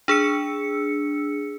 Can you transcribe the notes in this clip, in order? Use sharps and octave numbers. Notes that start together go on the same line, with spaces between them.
D4 G#4 E6 C#7